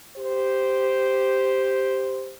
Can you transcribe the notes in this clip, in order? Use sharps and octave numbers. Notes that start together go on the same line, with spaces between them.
G4 C5